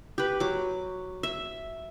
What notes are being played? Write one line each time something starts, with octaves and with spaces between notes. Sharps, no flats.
G4 B4
F#3 D6
E5